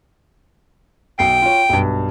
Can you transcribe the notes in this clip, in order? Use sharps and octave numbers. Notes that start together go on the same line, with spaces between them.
B1 B2 G5 C7
F4 C#5
B1 G2